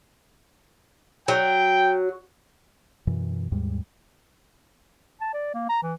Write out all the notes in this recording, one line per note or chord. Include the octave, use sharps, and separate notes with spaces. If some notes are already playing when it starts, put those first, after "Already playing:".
F#3 G5
F#2 B2 E3
D#2 G#2 G3 G#3
A5
D5
A#3
A#5
E3